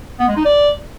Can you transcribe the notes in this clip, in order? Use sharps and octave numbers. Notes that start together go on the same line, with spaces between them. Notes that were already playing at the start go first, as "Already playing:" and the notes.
B3
G#3
D#4
D5